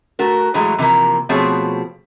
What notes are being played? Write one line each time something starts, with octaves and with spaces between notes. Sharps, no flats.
A3 F#4 A#4
A2 E3 F#3 G#3 A3
C3 E3 F3 A#3
B2 F3 A3 C4 G#4 C#5